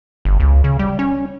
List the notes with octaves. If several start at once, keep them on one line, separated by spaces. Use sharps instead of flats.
G1
C#2
C#3
G3
C#4